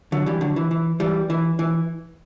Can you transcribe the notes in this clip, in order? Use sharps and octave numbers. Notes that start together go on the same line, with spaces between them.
D3 F#3
E3 G3
D3 F#3
E3
E3
E3 G3
E3
E3